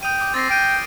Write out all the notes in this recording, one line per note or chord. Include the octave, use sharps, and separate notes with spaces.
G5 D#6 D#7
D6 D#6
C4 A6 A#6 C7
G5 F6 D7 D#7